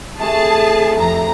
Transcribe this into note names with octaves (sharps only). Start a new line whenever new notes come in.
C3 E3 A3 G#4 A5
F2 C3 C4 A#5